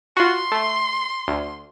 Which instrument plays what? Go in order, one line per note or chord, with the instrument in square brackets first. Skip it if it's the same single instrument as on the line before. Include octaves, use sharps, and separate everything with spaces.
[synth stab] F4 F#4 [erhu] C6
[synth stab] A3
D2